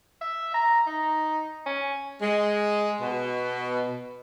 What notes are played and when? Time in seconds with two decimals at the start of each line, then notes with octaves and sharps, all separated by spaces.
0.21 E5
0.54 A#5
0.87 D#4
1.66 C#4
2.21 G#3
3.01 B2